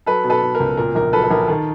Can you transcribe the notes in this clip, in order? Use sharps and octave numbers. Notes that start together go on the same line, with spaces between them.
F#3 A4 B4
B2
A4 B4
B2
A#4
C#2
A#2 A#4
A#1 A#4
F#3 A4 B4
B4
A#1 A#4
D#3 A4